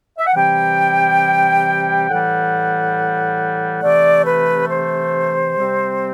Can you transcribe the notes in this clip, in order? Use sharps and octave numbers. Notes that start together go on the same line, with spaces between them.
E5
F#5
C3 E3 G3 G5
A2 E3 G3 F#5
C3 E3 A3 D5
B4
C5
C3 G3 C4